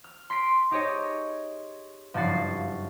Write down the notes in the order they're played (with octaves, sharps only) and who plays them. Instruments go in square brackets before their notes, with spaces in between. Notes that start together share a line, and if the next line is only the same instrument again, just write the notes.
[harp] F6
C6 B6 C7 D7
D#4 G4 G#4 C#5 D#5
F#1 G2 F3 F#4 A6 C7